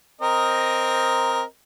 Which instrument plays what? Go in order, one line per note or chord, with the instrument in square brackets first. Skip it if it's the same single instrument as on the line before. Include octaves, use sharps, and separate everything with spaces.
[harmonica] C4 A#4 D#5